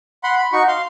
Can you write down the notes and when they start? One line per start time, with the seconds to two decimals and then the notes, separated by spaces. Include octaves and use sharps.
0.24 F#5 B5 C6
0.38 B5
0.53 D#4 F#4 C#6
0.68 F5 C6